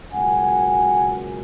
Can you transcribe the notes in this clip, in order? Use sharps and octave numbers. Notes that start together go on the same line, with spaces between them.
C#2 B2 F#3 A#3 F#5 G#5